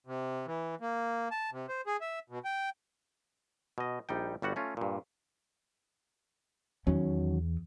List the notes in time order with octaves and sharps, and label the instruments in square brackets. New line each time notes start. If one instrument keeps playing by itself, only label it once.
[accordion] C3
E3
A#3
A5
C3
C5
G#4
E5
B2
G5
[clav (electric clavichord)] B2 D#5
A#1 G3 D#4 G5
G1 G3 F#4 F#5
A3 C#4 F4
G2 A#2
[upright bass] E2 [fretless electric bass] D#3 F#3 C#4